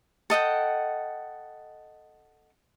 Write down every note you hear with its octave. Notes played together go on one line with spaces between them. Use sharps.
A4 D#5 F#5 G5